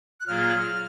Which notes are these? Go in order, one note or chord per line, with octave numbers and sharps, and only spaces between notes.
F#6
A#2 F#3 A#3 F4 G#4 F6